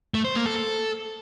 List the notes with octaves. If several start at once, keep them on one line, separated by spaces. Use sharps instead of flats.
A3
C5
A#3
A4
A4